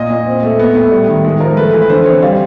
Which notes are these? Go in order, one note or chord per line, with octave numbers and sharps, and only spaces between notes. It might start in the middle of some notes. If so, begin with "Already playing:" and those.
Already playing: A#2 D#5
A#2
C4
A3
B3 B4
A2
G3
D#3
G#3
F3 A#4
A3 B4
E3
B4
D3 C5
C4 C#5
G3 F5